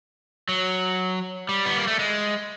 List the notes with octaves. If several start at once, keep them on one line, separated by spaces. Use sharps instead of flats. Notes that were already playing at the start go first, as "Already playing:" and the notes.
F#3
G3
B3
A#3
A3
G#3